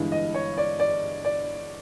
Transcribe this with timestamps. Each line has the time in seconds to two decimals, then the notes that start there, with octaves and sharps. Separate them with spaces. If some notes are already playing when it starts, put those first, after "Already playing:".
Already playing: G1 G2 E3 G#3
0.12 D#5
0.35 C#5
0.58 D5
0.80 D5
1.25 D5